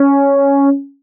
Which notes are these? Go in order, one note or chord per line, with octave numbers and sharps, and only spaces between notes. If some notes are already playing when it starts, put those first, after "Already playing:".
Already playing: C#4